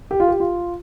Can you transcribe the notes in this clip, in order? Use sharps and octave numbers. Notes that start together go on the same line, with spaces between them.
G4
F4
G4
F4